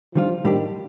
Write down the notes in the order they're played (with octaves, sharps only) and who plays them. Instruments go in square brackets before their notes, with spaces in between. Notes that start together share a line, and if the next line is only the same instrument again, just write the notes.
[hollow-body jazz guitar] D#3 G3 D4 F4 [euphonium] F3
[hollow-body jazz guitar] A2 G3 D4 G4 [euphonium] D#3